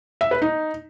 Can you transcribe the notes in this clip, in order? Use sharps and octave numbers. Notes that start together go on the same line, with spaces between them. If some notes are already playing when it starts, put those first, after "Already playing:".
E5
B4
D#4